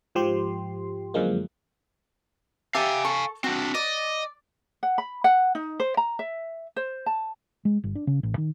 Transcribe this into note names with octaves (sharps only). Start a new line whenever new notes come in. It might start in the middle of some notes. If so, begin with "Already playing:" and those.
G#2 F3 G4 C6
F#2 D3 F3 G#3 A#3
G4 E5 F5 G#5 A5
A4 C#6
C4 D4 F#4
D5 D#5
F#5
B5
F#5
D#4
C5
A#5
E5
C5
A5
G#3
G1
D4
C#3
A1
D#3